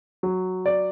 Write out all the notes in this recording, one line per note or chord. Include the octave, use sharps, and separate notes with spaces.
F#3
D5